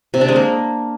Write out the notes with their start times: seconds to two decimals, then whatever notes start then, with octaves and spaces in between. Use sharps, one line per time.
0.14 C3
0.21 D4
0.28 G#3
0.36 A#3